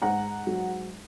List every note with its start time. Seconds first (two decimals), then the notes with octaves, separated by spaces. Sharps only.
0.02 G#2 F#5 A#5
0.47 F#3